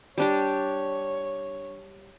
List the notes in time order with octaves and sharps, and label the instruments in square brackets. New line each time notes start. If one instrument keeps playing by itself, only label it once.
[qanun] G3 D4 G4 [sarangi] C#5